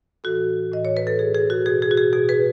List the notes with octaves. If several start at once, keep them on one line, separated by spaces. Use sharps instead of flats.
A2 E3 F#4 A4
A2 E3 D#5
C#5
B4
A4
B2 G#4
G#4
F#4
B2 G#4
G#4
F#4
G#4
B2 G#4
G#4 B4